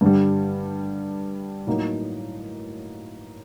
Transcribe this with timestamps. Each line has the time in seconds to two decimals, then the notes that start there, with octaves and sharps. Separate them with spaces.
0.01 G2 D3 G3
1.67 A2 F#3 A#3 D#4 F#4